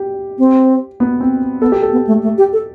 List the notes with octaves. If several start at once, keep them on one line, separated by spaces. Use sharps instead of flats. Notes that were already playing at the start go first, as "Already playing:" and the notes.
Already playing: G4
C4
B3
C4
B3 A4
G4
A4
B3
A3
A3
G4
A4